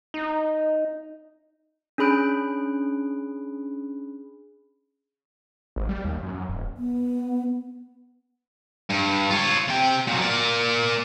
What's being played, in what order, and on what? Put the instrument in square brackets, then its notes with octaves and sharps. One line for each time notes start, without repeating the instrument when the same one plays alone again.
[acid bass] D#4
[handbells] C#4 D4 G#4 B5 F#6 D7
[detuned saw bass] G#1
G3
D#2
F#2
F#2
D#1
[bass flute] B3
[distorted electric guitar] G2
F4 C#5
C3 G5
A#2 F#3
A#3 D5